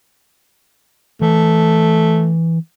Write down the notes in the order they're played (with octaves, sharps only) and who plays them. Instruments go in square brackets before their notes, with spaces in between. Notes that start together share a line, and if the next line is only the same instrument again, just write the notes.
[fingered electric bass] E3 [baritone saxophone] A3